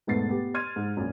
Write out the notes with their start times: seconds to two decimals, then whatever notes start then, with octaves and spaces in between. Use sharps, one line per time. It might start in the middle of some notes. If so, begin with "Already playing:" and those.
0.07 E1 G#2 A3 B3 A6 C7
0.29 B3 G4
0.54 C6 F6 G#6 A6 D#7
0.76 G#2
0.97 A#1 F#2